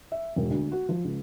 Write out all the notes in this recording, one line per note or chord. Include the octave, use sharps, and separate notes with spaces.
E5
E1
D2
F#4
F3
C#2